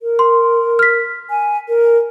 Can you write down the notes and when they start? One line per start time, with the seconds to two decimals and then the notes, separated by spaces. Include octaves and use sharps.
0.01 A#4
0.19 C6
0.79 F6 B6
1.30 G#5
1.68 A#4